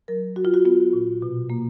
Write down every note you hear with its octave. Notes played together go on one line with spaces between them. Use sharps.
F#3 A#4
F#3 F#4
F4
F#4
B3 F4
A#2
B2
A#3